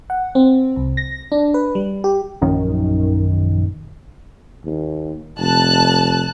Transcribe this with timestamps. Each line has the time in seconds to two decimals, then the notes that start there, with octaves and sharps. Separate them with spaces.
0.10 F#5
0.35 C4
0.76 C2
0.97 A#6
1.32 D4
1.54 B4
1.75 G3
2.04 G4
2.42 A#1 F#2 D#3
4.65 D#2
5.38 F1 A5 F#6